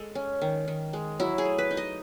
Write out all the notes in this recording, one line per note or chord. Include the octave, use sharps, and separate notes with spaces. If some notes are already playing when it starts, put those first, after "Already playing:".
Already playing: G#3 A4
C#4
D#3
D#3
G#3
F#3 E4
G#4
A3
B4
D#4
D#5